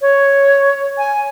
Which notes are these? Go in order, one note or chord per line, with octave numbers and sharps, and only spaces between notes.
C#5
G#5